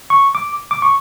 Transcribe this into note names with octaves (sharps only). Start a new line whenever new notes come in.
C#6
D6
D6
C#6